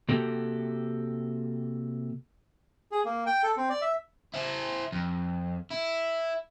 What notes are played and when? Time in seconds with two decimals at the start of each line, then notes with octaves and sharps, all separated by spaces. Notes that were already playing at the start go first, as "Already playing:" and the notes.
0.09 C3 A#3 F#4 G4 A4
2.92 G#4
3.05 A#3
3.26 G5
3.43 A4
3.57 C4
3.70 D5
3.82 E5
4.34 E4 C5
4.92 F2
5.71 E4